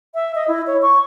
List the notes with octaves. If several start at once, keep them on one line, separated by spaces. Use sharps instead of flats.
E5
D#5
E4
C#5
C#6